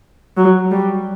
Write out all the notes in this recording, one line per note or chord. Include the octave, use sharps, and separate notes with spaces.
F#3
G3